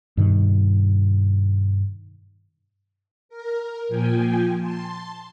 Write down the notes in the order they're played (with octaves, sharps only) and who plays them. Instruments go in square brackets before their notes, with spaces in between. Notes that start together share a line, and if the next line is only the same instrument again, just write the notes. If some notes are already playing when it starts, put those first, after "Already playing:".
[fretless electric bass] G2 B2 D#3
[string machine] A#4
A#2 F3 G5 G#5
A5 C6